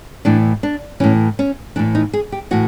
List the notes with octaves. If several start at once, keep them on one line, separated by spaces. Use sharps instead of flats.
A2 E3 D4
D4
A2 E3 C#4
C#4
A2 E3 D4
D#4
G#4
G4
A2 E3 F#4